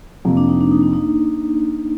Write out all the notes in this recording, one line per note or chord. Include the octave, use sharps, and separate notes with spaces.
F2 C3 F3 A#3
D4
D#4
D4
D#4
D4
D#4